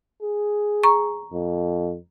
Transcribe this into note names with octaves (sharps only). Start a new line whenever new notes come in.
G#4
A#5 C#6
F2